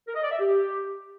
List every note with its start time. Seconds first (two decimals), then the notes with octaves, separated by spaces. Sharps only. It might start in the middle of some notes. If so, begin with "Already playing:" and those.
0.08 A#4
0.15 D#5
0.23 D5
0.31 E5
0.39 G4